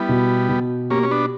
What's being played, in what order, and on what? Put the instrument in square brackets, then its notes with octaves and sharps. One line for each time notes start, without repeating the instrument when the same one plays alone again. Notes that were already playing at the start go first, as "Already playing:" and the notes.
Already playing: [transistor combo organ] G3 B3 [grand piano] E4
[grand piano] B2
B2
[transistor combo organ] A#3 C#4 [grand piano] G4
[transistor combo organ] C#4
B3 D4